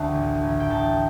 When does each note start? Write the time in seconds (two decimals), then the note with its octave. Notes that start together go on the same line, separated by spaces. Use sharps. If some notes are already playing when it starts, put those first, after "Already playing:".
Already playing: D2 D3 G5 A5
0.12 A1
0.41 A1
0.60 G5
0.70 D2 A5